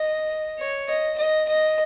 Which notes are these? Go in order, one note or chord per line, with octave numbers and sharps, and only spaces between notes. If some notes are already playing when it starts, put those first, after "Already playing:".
Already playing: D#5
C#5
D#5
D#5
D#5